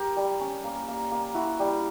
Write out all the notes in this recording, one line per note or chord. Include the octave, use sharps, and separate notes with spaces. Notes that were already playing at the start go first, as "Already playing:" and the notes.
Already playing: G4 A#4
G3
C#4
A#3
A#3
A#3
E4 F#4
G3